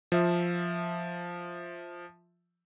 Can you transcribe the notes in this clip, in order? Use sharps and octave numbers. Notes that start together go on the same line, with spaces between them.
F3 E5